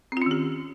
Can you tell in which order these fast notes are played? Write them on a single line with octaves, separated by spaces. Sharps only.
C4 F4 C#4 D#3 G4